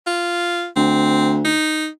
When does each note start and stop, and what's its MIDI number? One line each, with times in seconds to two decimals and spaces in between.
0.07 0.67 65
0.76 1.52 38
0.76 1.37 60
1.45 1.87 63